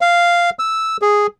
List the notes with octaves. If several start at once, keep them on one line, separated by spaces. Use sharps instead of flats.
F5
E6
G#4